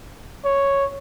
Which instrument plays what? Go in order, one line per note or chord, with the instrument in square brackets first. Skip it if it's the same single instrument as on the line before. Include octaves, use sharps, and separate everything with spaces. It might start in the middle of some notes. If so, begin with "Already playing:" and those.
[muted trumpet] C#5